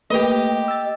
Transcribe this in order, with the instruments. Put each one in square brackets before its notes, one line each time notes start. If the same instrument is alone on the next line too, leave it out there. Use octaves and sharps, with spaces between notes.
[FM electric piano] A3 A#3 B4 [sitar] G4 D#5
[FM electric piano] E6 A6